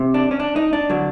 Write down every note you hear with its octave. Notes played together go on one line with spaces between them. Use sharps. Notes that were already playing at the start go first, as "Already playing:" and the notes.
Already playing: C3
D4
C#4
D4
D#4
D4
D3 F#3